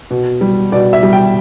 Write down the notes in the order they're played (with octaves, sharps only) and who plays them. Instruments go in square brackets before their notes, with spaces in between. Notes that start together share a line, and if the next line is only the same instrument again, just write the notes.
[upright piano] B2
G3
B2 D5
E5
G3
G5